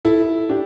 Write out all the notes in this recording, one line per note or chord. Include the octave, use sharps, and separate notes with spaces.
E4 A4
D4 G4